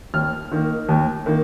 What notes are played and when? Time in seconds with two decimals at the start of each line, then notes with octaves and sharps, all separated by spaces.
0.14 D#2 F6
0.52 D#3 A#3
0.89 D#2
1.26 D#3 A#3